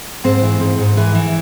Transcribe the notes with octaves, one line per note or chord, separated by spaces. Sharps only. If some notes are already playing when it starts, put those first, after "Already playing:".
G#2 C4
E3
G#2
G#2
E3
E3